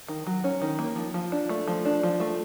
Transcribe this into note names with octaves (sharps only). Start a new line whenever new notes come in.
D#3
F#3
C#4
D#3
A#3
F3
F3
D4
A3
F3
D4
F3
A3